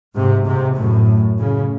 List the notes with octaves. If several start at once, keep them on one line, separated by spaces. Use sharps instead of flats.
G#2 C3
G#2 C3
F#2 A2
A2 C#3